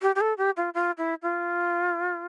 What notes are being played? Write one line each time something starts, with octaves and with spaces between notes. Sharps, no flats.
G4
G4
A4
G4
F4
F4
E4
F4